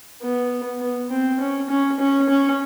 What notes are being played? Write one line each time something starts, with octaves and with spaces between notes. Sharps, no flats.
B3
B3
C4
C#4
C#4
C#4
C#4